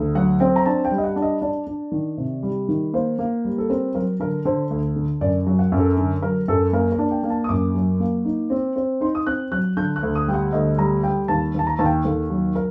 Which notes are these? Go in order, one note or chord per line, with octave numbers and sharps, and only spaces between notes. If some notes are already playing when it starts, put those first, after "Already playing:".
Already playing: D2
F#3 F#5
C4 G5
A#5
D4 A5
G5
G3
D#5
F#5
D4
D#5
D4 D5
D4
D#3
C3
G3
D#3
A#3 C5
A#3
G3
A4
C4 A#4
F#3 A#4
D3 A#4
D3 C5
D2
D3
F#2 D5
F#3
F#5
F#2
A4
D3
F#3 A#4
F#2 A4
A#3 A#4
A#4
D4
G5
A#3
A5
D#6
F#2 D6
F#3
A#3
D#4
C4
C4
D#4 C6
D#6
C4 F#6
F#3 F#6
D3 G6
F#6
D2
D#6
G3 G5
F#5
D2 D#5
G3 A#5
G3 G5
D#2 A5
D#2 A5
A#5
D#2 A5
G5
D#2 A4
F#3
A#4